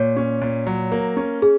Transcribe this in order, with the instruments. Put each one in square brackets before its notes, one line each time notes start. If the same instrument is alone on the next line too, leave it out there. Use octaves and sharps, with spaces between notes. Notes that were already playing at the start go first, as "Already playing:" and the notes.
Already playing: [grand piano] A#2 [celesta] C#5
[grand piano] C#4
A#2
F#3
A#3
C#4
[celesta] G#4